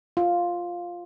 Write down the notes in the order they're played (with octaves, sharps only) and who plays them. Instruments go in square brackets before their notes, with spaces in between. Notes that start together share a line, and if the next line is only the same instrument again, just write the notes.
[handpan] F4